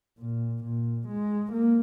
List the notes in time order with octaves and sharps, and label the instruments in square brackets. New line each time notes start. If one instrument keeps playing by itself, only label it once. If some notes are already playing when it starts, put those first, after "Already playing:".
[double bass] A#2
A#2
G#3
A#3